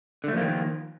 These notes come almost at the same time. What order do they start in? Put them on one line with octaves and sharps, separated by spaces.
D3 A3 F3 A#3 D#3